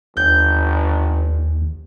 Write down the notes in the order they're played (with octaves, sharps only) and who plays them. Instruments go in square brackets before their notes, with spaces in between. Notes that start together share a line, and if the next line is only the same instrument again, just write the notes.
[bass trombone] G1 [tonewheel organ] D#2 [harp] G6